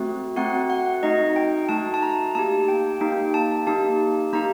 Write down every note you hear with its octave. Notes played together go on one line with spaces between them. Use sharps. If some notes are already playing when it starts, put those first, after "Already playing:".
Already playing: A3 C4 F#4
A3 C4 F#4 F#5
F#5
A3 D#4 F#4 D#5
G5
A3 D#4 F#4 A5
A5
A#5
A#3 D#4 G4 A5
G5
A#3 D#4 G4 G5
A5
A#3 D#4 G4 A5
A#3 D#4 G4 A#5